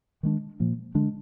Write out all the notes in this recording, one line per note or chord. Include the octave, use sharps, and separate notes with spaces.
D#3 G#3 D4
A#2 F3 A#3
D3 G#3 D4